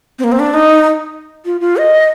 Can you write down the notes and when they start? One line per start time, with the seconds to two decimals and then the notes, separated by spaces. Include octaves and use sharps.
0.19 C4
0.24 A#3
0.32 C4
0.39 D4
0.54 D#4
1.45 F4
1.61 F4
1.77 D#5